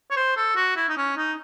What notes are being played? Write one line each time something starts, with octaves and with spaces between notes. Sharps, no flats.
C#5
C5
A4
F#4
E4
D#4
C#4
D#4